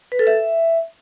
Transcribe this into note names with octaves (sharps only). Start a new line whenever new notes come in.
B4
A4
E5